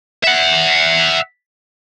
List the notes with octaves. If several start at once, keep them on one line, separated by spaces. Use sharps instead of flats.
E5 F#5